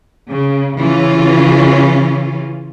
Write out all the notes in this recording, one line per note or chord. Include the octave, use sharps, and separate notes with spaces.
C#3
C#3 E3 C#4 F4